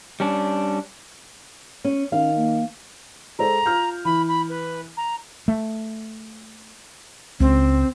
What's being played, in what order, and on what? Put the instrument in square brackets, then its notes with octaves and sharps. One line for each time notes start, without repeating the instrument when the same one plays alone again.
[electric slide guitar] G3 C#4 D4
[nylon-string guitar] C#4
[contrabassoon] D#3 [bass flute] C#4 [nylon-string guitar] F5
[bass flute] A#3
[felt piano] G#3 A4 C5 [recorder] A#5
[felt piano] F4 F6 G6
[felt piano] E3 [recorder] B5
[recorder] B5
B4
A#5
[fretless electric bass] A3
[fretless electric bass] C#2 [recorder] C4